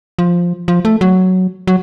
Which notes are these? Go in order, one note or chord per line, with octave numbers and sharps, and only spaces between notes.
F3
F3
A3
F#3
F#3